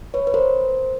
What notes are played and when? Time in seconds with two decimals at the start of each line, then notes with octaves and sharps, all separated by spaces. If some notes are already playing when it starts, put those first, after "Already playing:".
0.14 B4 C#5
0.27 B4
0.34 A#4 C5